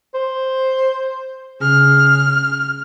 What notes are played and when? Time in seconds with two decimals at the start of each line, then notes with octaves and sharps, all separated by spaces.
0.15 C5
1.61 C#3 G#4 F6